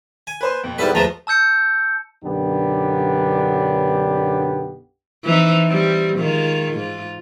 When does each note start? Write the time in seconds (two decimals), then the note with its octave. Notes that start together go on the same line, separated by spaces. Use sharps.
0.27 G#5
0.41 B4 C5 C6
0.64 F2 B2
0.78 G#2 G3 B3 E4 A4 B4
0.95 E2 F3 G#3 A3 B3 F4 A5 A#5
1.27 A5 E6 G6 C#7
2.24 B1 F#2 D3 B3 D4 G4
5.25 E3 C4 D#4
5.67 G3 C4
6.18 D#3 G#3 F4
6.74 G#2 F4